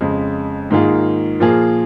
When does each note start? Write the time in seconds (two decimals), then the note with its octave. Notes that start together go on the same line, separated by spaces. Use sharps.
0.01 F2 C#3 G#3
0.71 G#2 D#3 A#3 F4 G#4
1.40 A#2 F3 A#3 F4 G#4